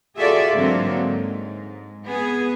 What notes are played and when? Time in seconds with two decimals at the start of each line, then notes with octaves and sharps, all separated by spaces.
0.17 F4 F#4 G#4 A4 D5 E5
0.53 G#2 D3 F#3 A#3 C4
0.95 G#2
2.05 B3 G#4